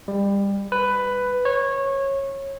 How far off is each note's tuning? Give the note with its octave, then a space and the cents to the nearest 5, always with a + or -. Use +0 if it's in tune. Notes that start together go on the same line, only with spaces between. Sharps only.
G3 +25
B4 +10
C#5 -20